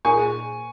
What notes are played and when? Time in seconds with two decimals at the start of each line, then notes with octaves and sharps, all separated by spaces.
0.05 A#2 A#3 D#4 G#4 G#5 C#6